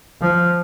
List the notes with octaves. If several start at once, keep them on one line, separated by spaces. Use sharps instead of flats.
F3